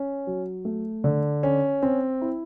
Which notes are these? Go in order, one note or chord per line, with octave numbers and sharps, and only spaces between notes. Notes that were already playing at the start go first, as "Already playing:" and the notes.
Already playing: C#4
F#3
A3
D3
C#4
C4
E4